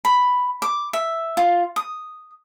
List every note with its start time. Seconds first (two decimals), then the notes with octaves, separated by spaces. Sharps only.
0.05 B5
0.62 D6
0.93 E5
1.37 F4
1.76 D#6